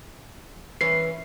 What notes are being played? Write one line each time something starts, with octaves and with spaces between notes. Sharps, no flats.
E3 C#4 B4 C7